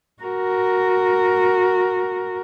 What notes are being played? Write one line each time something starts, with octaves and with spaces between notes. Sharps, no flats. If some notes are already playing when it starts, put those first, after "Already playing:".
F#4 A#4